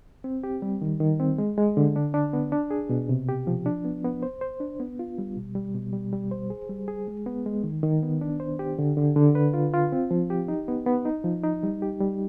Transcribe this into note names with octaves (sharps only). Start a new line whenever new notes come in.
C4
G4
G3
D#3
D#3
C4
G#3
G#3
D3
D4
D4
B3
D4
G#4
B2
C3
G4
F3
D4
B3
B3
C5
C5
D4
B3
F4
G3
B2
G3
B2
G3
G3
C5
G#4
G3
G#4
G#3
B3
G#3
D#3
D#3
B3
D4
C5
G4
D3
D3
D3
B4
F4
F4
C4
F3
G4
D#4
B3
B3
D#4
F3
D#4
G3
G4
G3